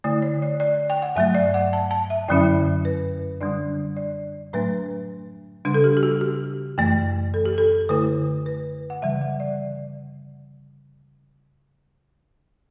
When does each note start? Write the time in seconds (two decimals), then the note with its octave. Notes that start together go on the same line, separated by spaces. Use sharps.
0.04 D3 A3 E4 D5
0.22 C#5
0.42 D5
0.60 D5
0.90 G5
1.02 F#5
1.16 G2 F#3 A3 E5
1.35 D5
1.54 F#5
1.73 A5
1.91 A5
2.10 E5
2.28 F#2 D3 F#3 C#4 E4 D5
2.85 B4
3.41 D3 G3 D4 D5
3.97 D5
4.53 A2 F#3 A3 D4 B4
5.65 C#3 G3 D4
5.74 A4
5.84 G4
5.97 G4
6.03 F#4
6.21 G4
6.78 F#2 E3 A3
7.34 A4
7.46 G4
7.58 A4
7.89 D3 A3 E4 B4
8.46 B4
8.90 F#5
9.02 C#3 E3 G3 E5
9.21 F#5
9.40 D5